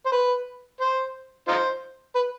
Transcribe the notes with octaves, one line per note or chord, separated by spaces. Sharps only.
C5
B4
C5
D#4 F4 C5
B4